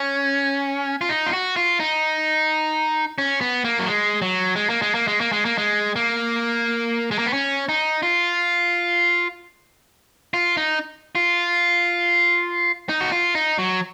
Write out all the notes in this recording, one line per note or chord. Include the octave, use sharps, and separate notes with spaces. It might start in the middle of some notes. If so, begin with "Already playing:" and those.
Already playing: C#4
F4
D#4
F4
F#4
F4
D#4
C#4
B3
A#3
F#3
G#3
F#3
G#3
A#3
G#3
A#3
G#3
A#3
G#3
A#3
G#3
A#3
G#3
A#3
B3
C#4
D#4
F4
F4
D#4
F4
D#4
F#4
F4
D#4
F#3